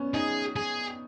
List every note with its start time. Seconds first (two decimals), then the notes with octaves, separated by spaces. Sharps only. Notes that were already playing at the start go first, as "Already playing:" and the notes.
Already playing: B3 C#4
0.14 D#4 G#4
0.56 G#4